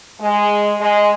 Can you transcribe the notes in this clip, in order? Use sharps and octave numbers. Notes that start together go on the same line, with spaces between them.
G#3
G#3